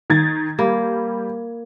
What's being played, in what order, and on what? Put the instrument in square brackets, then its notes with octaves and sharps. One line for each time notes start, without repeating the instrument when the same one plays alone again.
[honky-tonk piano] D#3 G#6 A6
[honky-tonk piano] G3 [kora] A#3